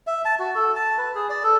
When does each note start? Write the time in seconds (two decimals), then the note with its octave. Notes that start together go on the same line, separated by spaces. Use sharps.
0.07 E5
0.25 A5
0.39 F#4
0.55 A4
0.75 A5
0.98 B4
1.15 G#4
1.30 D5
1.44 A4